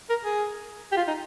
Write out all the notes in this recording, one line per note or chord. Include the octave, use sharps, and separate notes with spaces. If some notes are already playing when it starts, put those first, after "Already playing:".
A#4
G#4
G4
F4
D#4